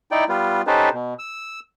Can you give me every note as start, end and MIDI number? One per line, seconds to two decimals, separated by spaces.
0.11 0.24 63
0.11 0.24 64
0.11 0.24 74
0.11 0.24 79
0.29 0.62 55
0.29 0.62 59
0.29 0.62 65
0.67 0.89 61
0.67 0.89 63
0.67 0.89 67
0.67 0.89 69
0.67 0.89 71
0.67 0.89 72
0.93 1.14 47
1.19 1.60 88